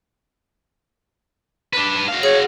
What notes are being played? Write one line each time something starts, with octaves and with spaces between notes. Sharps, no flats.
D4 B4
F#4 F5
G#4 C#5